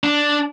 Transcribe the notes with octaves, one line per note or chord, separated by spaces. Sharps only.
D4